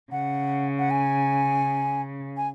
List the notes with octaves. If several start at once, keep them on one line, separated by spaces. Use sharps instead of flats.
C#3 F#5
F#5
G#5
G#5